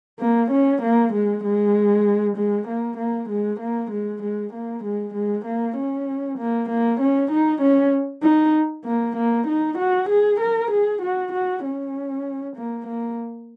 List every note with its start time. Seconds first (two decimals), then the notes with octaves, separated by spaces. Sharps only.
0.20 A#3
0.51 C#4
0.82 A#3
1.13 G#3
1.44 G#3
2.37 G#3
2.68 A#3
2.98 A#3
3.30 G#3
3.60 A#3
3.91 G#3
4.23 G#3
4.53 A#3
4.84 G#3
5.14 G#3
5.45 A#3
5.76 C#4
6.39 A#3
6.70 A#3
7.00 C#4
7.32 D#4
7.62 C#4
8.23 D#4
8.86 A#3
9.17 A#3
9.47 D#4
9.78 F#4
10.09 G#4
10.41 A#4
10.72 G#4
11.02 F#4
11.33 F#4
11.65 C#4
12.57 A#3
12.88 A#3